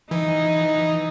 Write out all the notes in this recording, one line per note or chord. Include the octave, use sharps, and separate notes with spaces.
E3 D#4